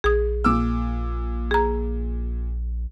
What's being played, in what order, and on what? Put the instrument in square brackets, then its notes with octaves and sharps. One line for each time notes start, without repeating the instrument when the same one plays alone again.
[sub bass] A#1 [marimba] G#4 D#6
[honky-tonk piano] A#2 D6 E6
[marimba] G#4 A#5